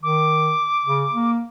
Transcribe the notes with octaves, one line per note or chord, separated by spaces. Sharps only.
D#3 D6
C#3
A#3